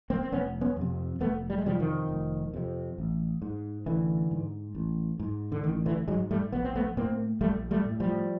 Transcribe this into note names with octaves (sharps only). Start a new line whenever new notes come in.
A#3 C4
C4
F1 B3 C#4
B3 C#4
F2 C3
F1 A3 B3
G3
G#3
F2 C3 F3 G3
D#3 F3
F1
F2 C3
A1
G#2
A1 D3 E3
G#2
A1
G#2
D3
A1 D#3
D3 E3
G#2 F#3 G#3
G3 A3
A#1 B3
C4
A3 B3
A2 A#3 C4
A#1 G3 A3
G3 A3
A2
F3 G3